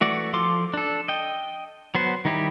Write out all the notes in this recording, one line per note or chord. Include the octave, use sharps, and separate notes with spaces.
E3 A3 F#4 D5
F3 F4 A4 C6 D6
D4 A4
D#5 G5
F#3 B3 C5
D#3 G3 D#4 E4 G4